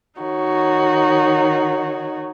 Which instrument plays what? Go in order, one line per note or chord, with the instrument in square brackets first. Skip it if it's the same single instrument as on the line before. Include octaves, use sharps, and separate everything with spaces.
[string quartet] D#3 D#4 F#4 C#5